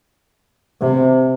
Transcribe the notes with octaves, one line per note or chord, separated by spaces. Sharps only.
C3